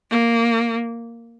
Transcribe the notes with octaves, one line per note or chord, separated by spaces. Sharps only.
A#3